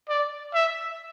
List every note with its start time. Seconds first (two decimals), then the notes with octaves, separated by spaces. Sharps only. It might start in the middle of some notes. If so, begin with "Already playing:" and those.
0.09 D5
0.54 E5